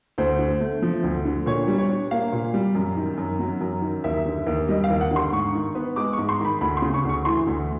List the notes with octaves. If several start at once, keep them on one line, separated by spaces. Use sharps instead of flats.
D2 C5
D3
A3
F3
D2
D3
A#2 C#5
G3
C#5
D4
A#3 F5
A#2
G3
F#2
D#3
F#2
F#3
F#2
D#3
D#2 E5
D3
D#2
G3 D#5
F5
D#2
F#5
D3
C6
G#2 C#6
D#3
B3
G#3 D6
C#6
G#2
C6
D#3 B5
D2 B5
C6
C#3
C#6
D2 C#6
E3 C6
D2